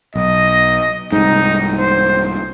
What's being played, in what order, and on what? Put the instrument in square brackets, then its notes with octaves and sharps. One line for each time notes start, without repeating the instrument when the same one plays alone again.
[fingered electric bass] B1 [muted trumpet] D#5
[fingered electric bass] C2 G#2 [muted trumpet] D#4
[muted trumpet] C5